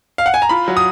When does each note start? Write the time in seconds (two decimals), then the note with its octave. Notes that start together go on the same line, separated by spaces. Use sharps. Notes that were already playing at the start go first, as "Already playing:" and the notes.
0.18 F5
0.26 F#5
0.34 G#5
0.42 A#5
0.49 F4 B5
0.68 F#3
0.77 D#6